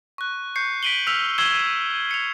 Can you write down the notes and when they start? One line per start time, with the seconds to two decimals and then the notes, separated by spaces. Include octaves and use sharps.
0.18 C#6 F#6
0.56 C#6 G6 C7 C#7
0.83 B6 D7 D#7 F#7 G7
1.07 E6 F6 B6 F7
1.38 C#6 E6 G#6 C7 E7 G7
2.11 C#7 F7